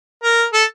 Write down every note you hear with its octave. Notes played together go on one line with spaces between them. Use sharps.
A#4
A4